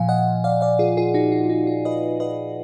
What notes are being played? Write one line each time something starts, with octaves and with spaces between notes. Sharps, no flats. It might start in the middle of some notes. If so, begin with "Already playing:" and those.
Already playing: A#2 F3 F5 G#5
D#5 F#5
D5 F5
D5 F5
F4 G#4
F4 G#4
D#4 F#4
F4
D#4
F4
B4 D#5
B4 D#5